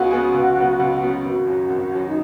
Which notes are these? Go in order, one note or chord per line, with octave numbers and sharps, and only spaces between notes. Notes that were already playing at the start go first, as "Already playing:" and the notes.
Already playing: C#2 C#3 B3 F#4 G#4
C#3 B3 G#4
C#2
C#3 F#3 B3
C#2
C#3 F#3 B3
G#1 F#4
F#2 F#3
G#1
F#2 F#3
D#4